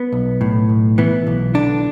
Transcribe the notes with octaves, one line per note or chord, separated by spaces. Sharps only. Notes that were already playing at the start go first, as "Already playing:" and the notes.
Already playing: B3
B1
A2
B1
E3 B3
B1
D3 D4